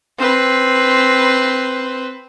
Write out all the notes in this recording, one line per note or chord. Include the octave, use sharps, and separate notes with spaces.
C4 B4